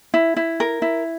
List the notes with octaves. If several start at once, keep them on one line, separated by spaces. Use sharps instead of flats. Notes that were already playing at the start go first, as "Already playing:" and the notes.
E4
E4
A#4
E4